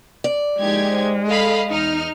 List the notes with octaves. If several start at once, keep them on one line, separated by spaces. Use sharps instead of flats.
D5
F3 G#3 A#3 D#4 E4 G4 G#6
C5
A4 D#5 F5 B5
E2 D#4 F6